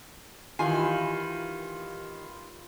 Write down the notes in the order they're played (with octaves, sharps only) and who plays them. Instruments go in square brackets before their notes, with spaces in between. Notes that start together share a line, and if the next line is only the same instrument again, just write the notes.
[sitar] D#3 [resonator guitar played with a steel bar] E3 G#5 [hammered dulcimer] F4 [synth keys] G4 B5 C7